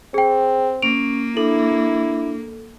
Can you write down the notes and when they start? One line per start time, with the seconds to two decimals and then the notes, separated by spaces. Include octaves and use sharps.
0.14 C4 G#4 G5
0.82 A#3 C#4 D7
1.37 D4 E4 A4